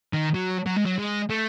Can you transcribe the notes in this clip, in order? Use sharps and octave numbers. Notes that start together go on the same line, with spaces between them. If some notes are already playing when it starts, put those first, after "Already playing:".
D#3
F#3
F#3
G#3
F#3
G#3
A3